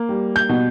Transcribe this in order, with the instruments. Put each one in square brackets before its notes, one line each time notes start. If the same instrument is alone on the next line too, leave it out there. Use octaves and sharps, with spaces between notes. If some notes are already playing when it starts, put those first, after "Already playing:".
Already playing: [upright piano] A#3
G3
G6
B2